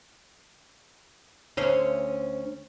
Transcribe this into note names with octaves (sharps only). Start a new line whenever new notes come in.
D2 C#4 C5